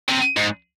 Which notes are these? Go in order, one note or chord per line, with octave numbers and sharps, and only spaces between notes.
C3
G#2